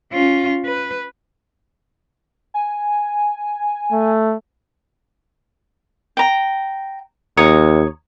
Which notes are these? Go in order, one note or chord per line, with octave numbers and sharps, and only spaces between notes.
C#4 F4
B4
G#5
A3
G5 A#5
D#2 C#5 A#5 D#6